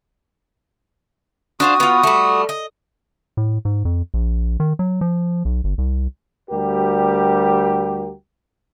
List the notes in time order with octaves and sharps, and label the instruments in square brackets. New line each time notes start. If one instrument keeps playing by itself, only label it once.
[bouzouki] D4 C5 F5 [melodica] F#4 D#6
[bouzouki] B3 F4
G3 A3
D#5
[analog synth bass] A2
G#2
F2
A#1
D#3
F#3
F3
B1
G1
C2
[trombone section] D2 G3 F#4 G4 A#4